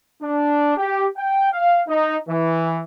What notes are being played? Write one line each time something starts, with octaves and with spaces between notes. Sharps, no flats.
D4
G4
G5
F5
D#4
E3